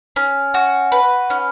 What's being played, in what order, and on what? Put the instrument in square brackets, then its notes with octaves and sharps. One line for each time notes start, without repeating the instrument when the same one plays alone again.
[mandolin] C#4
F#4
B4
C#4